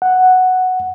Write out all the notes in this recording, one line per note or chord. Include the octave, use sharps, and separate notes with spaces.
F#5